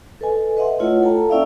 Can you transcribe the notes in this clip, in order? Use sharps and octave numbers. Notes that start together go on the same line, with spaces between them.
A4 B4 D#5 G#5
B4 D#5 E5 F#5 C6
A3 E4 F4 C#5 F#5
A4 G5 A5 A#5
A#3 C#4 E4 D5 E5 F5